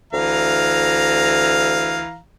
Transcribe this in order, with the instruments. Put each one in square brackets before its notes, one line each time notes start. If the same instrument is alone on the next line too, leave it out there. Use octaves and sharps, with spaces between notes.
[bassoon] D2 [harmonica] E3 F5 A#5